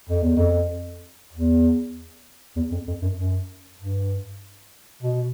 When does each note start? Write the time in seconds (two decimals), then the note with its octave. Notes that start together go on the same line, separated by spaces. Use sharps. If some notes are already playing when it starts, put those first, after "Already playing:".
0.09 F2
0.23 E2
0.37 F2
1.33 E2
2.56 E2
2.72 F2
2.88 F2
3.02 F#2
3.18 F#2
3.80 G2
5.03 B2